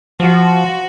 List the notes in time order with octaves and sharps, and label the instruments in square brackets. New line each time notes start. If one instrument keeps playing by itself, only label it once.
[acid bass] F3 [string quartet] F#4